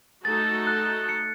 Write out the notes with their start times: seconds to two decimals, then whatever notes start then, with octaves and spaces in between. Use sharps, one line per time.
0.25 A3 D#4 F#4 A4 A6
0.67 F#6
1.09 C#7